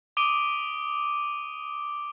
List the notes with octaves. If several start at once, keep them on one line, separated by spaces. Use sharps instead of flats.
D6 D#6 D7 D#7 G7